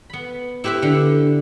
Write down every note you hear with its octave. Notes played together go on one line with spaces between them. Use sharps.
B3 B5
E4 G4 B4 C5 E5
D3